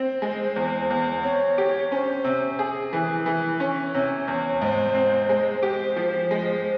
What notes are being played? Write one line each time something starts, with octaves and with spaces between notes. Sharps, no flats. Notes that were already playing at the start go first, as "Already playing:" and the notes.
Already playing: C4 C5
G#3
E2
E2
C4 C#5
G4
C#4 C5
C3
G#4
E3
E3
C#4
C3 C#5
E2
G#2 C5
C4
G#3 C5
G4
F3
G#3